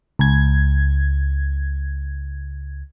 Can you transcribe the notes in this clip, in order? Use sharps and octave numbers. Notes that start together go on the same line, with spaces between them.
C#2 G#6